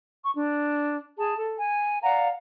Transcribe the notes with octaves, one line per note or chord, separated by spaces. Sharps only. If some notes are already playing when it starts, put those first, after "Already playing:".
C#6
D4
G#4 A5
A4
G#5
D5 F5 F#5 A#5